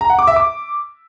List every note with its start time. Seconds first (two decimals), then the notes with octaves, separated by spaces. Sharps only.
0.01 A#5
0.10 F#5
0.19 D6
0.27 E5
0.36 D6